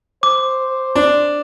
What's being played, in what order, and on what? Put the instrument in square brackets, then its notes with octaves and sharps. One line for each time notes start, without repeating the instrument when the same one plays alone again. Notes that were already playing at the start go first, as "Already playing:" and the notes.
[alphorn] C5 [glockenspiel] D6
[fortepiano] D4